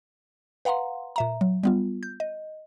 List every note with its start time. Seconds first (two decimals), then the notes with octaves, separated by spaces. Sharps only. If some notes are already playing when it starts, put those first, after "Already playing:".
0.65 B4 F5 F#5 A#5 C6
1.16 A#2 E5 A#5
1.41 F#3
1.63 G3 B3 F4
2.03 G6
2.20 D#5